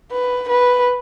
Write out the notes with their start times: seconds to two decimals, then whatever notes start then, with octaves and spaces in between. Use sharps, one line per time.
0.11 B4
0.49 B4